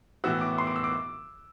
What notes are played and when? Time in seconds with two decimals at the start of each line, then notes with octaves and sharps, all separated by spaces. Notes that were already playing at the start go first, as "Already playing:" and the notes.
0.24 A2 E3 B3 F#4 E6
0.41 D6
0.58 C6
0.67 D6
0.76 E6
0.84 D6